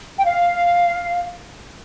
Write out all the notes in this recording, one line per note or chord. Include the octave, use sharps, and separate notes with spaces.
G5
F5